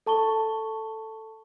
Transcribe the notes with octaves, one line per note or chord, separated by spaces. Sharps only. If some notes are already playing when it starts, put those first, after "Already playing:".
A4 A5 C#6 G7